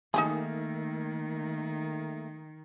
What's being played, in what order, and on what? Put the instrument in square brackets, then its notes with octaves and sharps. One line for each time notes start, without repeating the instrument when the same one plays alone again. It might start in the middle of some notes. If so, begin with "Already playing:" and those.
[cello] D#3 [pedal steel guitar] A3 A#3 [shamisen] D#4 G4 G#4